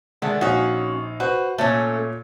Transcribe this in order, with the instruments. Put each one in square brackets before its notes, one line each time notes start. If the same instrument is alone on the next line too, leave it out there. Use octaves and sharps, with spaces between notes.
[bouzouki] D3 D#3 A3 [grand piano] G#3
[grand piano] A#1 D#4 F5 [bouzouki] C#4 F#4
[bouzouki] F#4 [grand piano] B4 C5
[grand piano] A#2 C#5 [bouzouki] A3 C#4